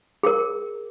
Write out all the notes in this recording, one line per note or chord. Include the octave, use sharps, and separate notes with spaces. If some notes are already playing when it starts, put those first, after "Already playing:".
G#4 A#4